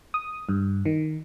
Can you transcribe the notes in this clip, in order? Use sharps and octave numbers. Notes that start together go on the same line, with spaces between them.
D#6
G2
D#3